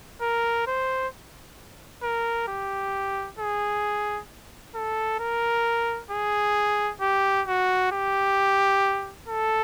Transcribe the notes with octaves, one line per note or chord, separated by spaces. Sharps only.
A#4
C5
A#4
G4
G#4
A4
A#4
G#4
G4
F#4
G4
A4